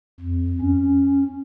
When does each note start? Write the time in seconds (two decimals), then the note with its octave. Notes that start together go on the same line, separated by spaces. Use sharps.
0.20 F2
0.62 C#4